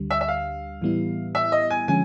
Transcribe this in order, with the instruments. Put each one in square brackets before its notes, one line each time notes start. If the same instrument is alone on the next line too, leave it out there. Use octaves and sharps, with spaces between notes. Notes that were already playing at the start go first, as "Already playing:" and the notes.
Already playing: [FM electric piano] D2 D3 G3
[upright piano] E5
E5
F5
[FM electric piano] A2 E3 G3 B3 E4
[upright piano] E5
D#5
G#5
[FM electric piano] D3 F3 G#3 C#4 [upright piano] G#5